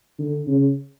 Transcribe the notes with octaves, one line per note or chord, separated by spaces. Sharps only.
D3
C#3